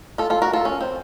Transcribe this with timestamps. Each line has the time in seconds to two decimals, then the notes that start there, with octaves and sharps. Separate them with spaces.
0.18 F4 A4
0.30 F4 A4
0.42 F#4 A#4
0.53 F4 A4
0.65 C#4
0.81 C4